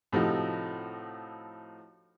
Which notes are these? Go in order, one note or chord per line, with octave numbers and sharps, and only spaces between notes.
A2 C3 F3 A3 D#4 F#4